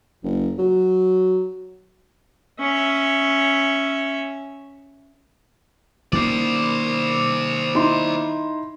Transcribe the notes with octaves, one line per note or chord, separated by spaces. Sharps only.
F#1
F#3
C#4 E5
D#3 A#3 C#4 C5 D5
D#4 E4 C6